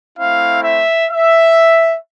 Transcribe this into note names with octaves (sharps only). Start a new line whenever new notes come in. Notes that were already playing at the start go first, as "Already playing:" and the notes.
A3 C4 E4 F5
E5
E5